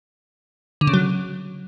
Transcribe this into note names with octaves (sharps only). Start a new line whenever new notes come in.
D3
C#3
F#3